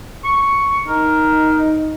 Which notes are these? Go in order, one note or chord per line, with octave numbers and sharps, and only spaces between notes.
C#6
D#4 A#4